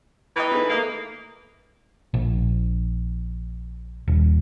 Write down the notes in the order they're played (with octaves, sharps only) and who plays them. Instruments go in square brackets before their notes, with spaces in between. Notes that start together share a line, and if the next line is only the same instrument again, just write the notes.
[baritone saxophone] E3 [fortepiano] D#5 G5 A#5
[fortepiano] D#4 G#4 B4
[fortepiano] A3 D#5 [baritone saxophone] A#3
[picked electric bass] A#1
D#1